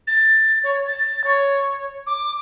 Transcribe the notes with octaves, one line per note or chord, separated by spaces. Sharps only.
A6
C#5
A6
C#5
D6